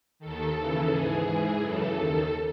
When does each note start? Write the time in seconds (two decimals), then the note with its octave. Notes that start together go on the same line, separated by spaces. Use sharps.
0.19 D#2 D#3 A4
0.55 D#2 C#3 E3
0.89 G#2 E3 G#4
1.25 G#2 E3
1.59 F#2 C#3 E3 A4
1.94 D#2 D#3